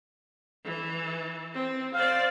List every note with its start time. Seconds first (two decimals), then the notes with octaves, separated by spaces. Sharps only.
0.64 E3
1.54 C4
1.94 C5 D5 F5